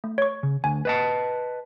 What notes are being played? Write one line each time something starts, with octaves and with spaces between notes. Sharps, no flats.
A3
C#5 C#6
C#3
D2 G#5
B4 D#5 A5